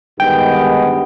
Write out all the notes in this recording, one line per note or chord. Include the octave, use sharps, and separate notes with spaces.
G2 D#3 G#3 B3 G5